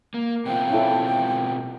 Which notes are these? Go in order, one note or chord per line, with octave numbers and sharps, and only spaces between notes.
A#3
B2 C4 F4 G5
C#4 E4 A4